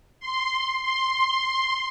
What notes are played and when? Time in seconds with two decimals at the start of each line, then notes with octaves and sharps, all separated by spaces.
0.20 C6
0.83 C6